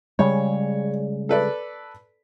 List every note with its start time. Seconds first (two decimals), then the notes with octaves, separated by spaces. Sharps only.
0.19 C#3 G3 G#3 C#5
1.29 A4 B4 D5